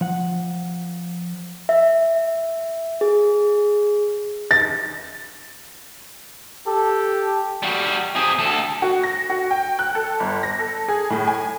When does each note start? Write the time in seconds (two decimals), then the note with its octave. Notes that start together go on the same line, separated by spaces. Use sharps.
0.01 F3 F#5
1.69 E5
3.01 G#4
4.51 A6
6.67 G4 A4
7.63 G3 F#4
8.16 C4 G#4
8.38 D2 A4
8.82 F#4
9.03 A#6
9.30 F#4
9.51 G5
9.79 F#6
9.95 A4
10.20 G1
10.43 A#6
10.59 A4
10.88 G#4
11.10 A2
11.27 G#5